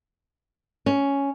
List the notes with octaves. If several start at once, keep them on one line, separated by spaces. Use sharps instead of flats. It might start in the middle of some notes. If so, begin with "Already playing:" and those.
C#4